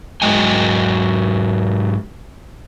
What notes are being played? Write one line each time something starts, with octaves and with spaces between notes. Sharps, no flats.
G#2 F#3 G#3 D#5 G5 G#5